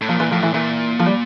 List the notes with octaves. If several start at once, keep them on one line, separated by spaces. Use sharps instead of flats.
A2
A#2 F3
E3
A2 F3
E3
A#2 E3
F3
G3